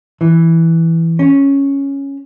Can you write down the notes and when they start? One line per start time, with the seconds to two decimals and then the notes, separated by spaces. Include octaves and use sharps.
0.21 E3
1.19 C#4